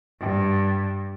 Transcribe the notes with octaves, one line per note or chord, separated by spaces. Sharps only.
G2